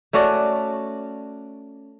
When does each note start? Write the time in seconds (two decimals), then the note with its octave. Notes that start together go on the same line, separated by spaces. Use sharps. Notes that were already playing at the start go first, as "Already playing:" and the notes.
0.13 A3 C#4 F#4 D5